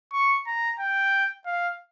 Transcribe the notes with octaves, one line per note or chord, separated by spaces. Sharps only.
C#6
A#5
G5
F5